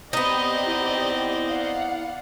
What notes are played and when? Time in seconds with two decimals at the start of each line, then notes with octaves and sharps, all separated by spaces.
0.13 B3 C4 D#4 G4 D5 D#5
0.67 E4
1.50 D5 F5 F#5